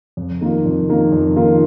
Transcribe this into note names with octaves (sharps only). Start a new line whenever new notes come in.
F2
D#3 A#3 F4
F2
D#3 A#3 F4
F2
D#3 A#3 F4